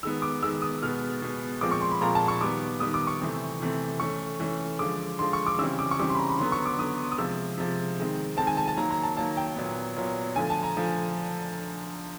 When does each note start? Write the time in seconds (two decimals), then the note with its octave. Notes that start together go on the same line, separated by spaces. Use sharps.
0.03 D#3 G#3 B3 E6
0.22 D6
0.43 D#3 G#3 B3 E6
0.62 D#6
0.83 B2 G#3 B3 F6
1.22 B2 G#3 B3
1.61 A#2 F3 G#3 C4 D6
1.71 C#6
1.81 C6
1.91 B5
2.01 A#2 F3 G#3 C4 A#5
2.15 A5
2.28 C#6
2.41 D#3 G3 B3 D6
2.80 D#3 G3 B3 D#6
2.94 D6
3.07 C#6
3.21 C3 E3 A3 C4
3.60 C3 E3 A3 C4
4.00 E3 A3 C#4 C#6
4.40 E3 A3 C#4
4.79 D3 F3 G#3 D6
5.19 D3 F3 G#3 C6
5.33 C#6
5.47 D6
5.59 C#3 E3 G3 C4 E6
5.79 D6
5.91 C#6
5.99 C#3 E3 G3 C4 D6
6.09 C6
6.15 B5
6.19 A#5
6.29 B5
6.38 D3 F#3 B3 C6
6.52 C#6
6.66 D6
6.78 D3 F#3 B3 D#6
7.12 D#6
7.18 C3 F3 G#3 E6
7.57 C3 F3 G#3
7.98 D#3 G#3 C4
8.37 D#3 G#3 C4 A5
8.47 G#5
8.57 A5
8.68 A5
8.77 D#3 F#3 A#3 A#5
8.90 A#5
9.03 A5
9.17 D#3 F#3 A#3 A5
9.37 G5
9.56 A#2 F#3 B3
9.96 A#2 F#3 B3
10.36 D3 F3 A3 G#5
10.50 A5
10.63 A#5
10.76 D3 F3 A3